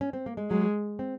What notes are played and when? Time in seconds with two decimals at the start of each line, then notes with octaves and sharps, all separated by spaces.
0.01 C#4
0.13 C4
0.26 A#3
0.37 G#3
0.50 F#3 G#3
0.99 C4